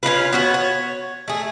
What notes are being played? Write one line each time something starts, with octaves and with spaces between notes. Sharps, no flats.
C#4 D#4 F4 B4
B3 F#4 C#5
C#5
A3 G#4